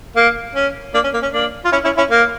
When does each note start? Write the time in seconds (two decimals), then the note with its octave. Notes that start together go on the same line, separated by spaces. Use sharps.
0.16 A#3
0.55 C#4
0.94 A#3 D4
1.04 C#4
1.14 A#3
1.23 C#4
1.33 A#3 D4
1.65 F4
1.72 C#4 E4
1.84 C#4 E4
1.97 C#4 E4
2.11 A#3